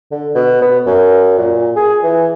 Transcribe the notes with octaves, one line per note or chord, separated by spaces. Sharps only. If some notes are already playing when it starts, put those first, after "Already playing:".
D3
B2
B3
F#2
A#2
G#4
E3